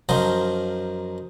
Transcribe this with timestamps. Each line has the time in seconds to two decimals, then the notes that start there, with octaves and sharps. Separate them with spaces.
0.09 F#2 F3 D#4 C5 A#5